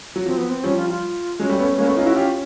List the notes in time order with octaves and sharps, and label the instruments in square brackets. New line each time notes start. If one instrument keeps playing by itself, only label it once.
[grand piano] F#3
[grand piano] F3 [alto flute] C4
[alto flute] B3
C4
[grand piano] F3 G3 [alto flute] C#4
[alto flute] F4
F4
[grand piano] F#3 G#3 [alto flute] C#4
[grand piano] G3 A3
A3 B3
G#3 A#3
A3 B3
D#4 F4
E4 F#4
F4 G4